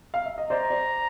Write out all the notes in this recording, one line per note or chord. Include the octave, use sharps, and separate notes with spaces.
F5
E5
D#5
C5 D5 A#5
C5 D5